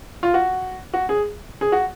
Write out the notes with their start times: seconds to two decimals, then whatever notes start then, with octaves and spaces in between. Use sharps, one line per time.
0.23 F4
0.34 F#4
0.93 F#4
1.09 G#4
1.61 G#4
1.72 F#4